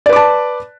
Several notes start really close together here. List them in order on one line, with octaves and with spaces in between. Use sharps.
D5 B4 D6 A5